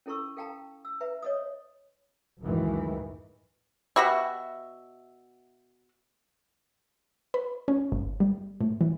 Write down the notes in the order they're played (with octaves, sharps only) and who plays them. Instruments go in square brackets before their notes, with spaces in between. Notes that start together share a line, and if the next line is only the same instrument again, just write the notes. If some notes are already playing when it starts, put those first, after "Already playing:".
[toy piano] C#4 E4 A4 A#5 C#6 E6
A4 F5 G5 A5 A#5
E6
B4 E5 A#5
C#5 D#5 D#6
[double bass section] C#2 F#2 A2 D#3 E3
[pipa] B2 F#4 E5 [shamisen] G4 B5
[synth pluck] B4
C#4
G1
G3
A2
E3